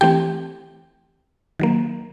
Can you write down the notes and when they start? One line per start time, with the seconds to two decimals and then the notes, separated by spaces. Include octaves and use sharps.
0.01 E3 A3 C4 G4 G5
1.60 D#3 F#3 A#3